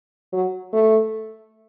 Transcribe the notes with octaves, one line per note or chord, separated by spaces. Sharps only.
F#3
A3